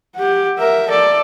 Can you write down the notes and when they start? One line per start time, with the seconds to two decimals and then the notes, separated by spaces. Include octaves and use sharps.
0.16 G4 F#5
0.59 A#4 E5
0.89 A4 D5